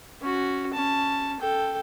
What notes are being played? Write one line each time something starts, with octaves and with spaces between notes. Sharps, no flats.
C#4 F#4
C#4 A5
A4 G5